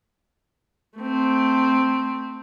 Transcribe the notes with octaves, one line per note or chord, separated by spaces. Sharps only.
A3 C4